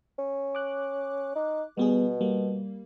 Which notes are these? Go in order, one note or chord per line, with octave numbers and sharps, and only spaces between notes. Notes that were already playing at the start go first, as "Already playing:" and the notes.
C#4
D6 F#6
D#4
B2 G3 B3 G#4
G3 A#3